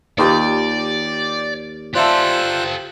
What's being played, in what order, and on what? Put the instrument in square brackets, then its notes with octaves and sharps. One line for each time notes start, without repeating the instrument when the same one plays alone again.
[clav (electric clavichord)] D#2 [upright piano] D#4 F4 G4 [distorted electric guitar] D5
[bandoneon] F4 C5 F#6 [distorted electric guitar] G4 A4 [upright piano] D5 E5 A5